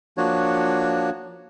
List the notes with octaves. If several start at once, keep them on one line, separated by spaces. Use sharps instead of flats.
F3 A#3 D4 F#4 C#5